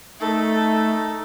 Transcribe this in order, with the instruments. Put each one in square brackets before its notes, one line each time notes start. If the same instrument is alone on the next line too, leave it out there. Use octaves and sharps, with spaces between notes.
[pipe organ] A3 [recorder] D#4 [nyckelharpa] A4